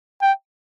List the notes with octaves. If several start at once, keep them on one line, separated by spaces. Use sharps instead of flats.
G5